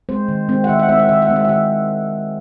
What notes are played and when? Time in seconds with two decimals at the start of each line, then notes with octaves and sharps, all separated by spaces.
0.09 G#3 C4 C5
0.28 D#3
0.49 G#3 C4
0.64 F#5
0.69 D#3 E5
0.79 F#5
0.89 G#3 C4 E5
0.99 F#5
1.09 D#3 E5
1.22 F#5
1.29 G#3 C4
1.36 E5
1.45 F#5
1.49 D#3 E5